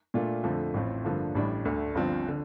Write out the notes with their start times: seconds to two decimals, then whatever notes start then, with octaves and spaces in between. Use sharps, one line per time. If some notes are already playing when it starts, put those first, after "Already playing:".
0.14 A#2 A3 D4 F4
0.44 F2 D3 F3 A3
0.74 A1 A2 A3 C4 F4
1.04 G2 D3 F3 A#3
1.35 A1 A2 G3 D4
1.65 D2 D3 A3
1.95 G1 G2 F3 C4 F4
2.28 D3